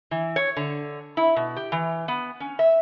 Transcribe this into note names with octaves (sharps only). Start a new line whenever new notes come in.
E3
C#5
D3
E4
B2
G4
E3
B3
C#4
E5